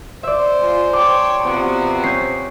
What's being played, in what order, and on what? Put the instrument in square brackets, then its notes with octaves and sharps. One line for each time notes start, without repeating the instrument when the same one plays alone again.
[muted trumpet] C5 [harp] D5 E5
[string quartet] G#3 F4
[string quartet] C#5 G5 A5 [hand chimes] C6 D6
[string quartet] C3 F3 F#4 [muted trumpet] B3
[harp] C#4 [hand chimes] G6 C7